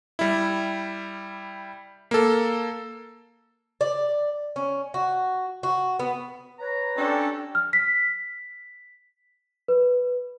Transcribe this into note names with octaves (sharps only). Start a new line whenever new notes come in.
G3 E4
A#3 A4
D5
C#4
F#4
F#4
B3
B4 C#5 A#5
C#4 D4 G4 A4
F6
B6
B4